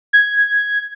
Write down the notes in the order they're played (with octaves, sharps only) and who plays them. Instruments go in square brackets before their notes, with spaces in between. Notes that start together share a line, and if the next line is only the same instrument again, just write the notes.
[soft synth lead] G#6